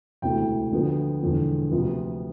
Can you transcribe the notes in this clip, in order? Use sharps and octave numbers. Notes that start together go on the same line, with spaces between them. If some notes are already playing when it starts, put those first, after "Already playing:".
E1 D2 C3 E3 A3 G5
D2 D3 F3 B3
E1 E2 D3 F3
D2 C3 F3 B3